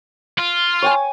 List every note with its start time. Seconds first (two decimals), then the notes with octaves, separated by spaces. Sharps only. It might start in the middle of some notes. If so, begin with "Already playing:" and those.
0.39 F4
0.82 C#5 G5 G#5